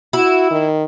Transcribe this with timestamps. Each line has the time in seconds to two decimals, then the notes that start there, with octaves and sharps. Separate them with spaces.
0.13 E4 F#4
0.51 D#3